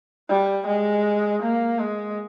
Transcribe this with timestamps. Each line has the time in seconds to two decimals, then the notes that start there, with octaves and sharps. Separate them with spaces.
0.29 G3
0.67 G#3
1.42 A#3
1.79 G#3